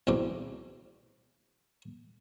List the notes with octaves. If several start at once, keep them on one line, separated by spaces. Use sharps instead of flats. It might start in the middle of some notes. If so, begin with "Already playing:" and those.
B1 E2 B2 C4 D6